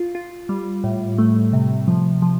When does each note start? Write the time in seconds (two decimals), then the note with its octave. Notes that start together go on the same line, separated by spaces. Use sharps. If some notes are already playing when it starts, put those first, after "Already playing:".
Already playing: F4
0.15 F4
0.49 G3
0.84 A2
1.18 A3
1.53 C3
1.88 F3
2.22 F3